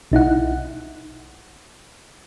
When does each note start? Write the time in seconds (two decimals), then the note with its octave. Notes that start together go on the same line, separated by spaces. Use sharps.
0.12 B1 D#4 E4 F#5